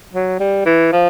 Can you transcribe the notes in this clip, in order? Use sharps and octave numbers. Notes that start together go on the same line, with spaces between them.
F#3
G3
E3
F3